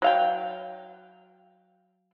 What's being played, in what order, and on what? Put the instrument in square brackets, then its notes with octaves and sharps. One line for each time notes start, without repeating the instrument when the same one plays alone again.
[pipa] F#3 F5 G5